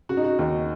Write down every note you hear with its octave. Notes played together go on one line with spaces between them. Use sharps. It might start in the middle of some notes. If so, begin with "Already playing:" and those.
C#3 F#4
D#4
F#4
D#2 D#4